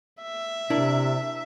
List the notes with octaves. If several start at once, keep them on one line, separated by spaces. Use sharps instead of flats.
E5
C3 D4 E4 A#4